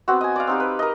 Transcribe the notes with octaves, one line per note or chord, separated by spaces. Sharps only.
B3 C4 F#4
D#5 G#5
D5 F5
C4 D#4 G4
B4
A#4 D#5